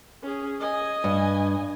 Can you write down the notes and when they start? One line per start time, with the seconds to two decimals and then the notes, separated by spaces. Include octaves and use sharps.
0.23 C#4 G#4
0.60 D#5 G#5
1.04 G2